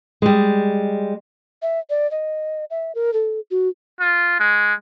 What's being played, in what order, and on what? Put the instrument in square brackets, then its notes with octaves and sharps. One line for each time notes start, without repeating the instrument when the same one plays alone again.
[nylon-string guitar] G3 G#3
[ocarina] E5
D5
D#5
E5
A#4
A4
F#4
[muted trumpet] F4
G#3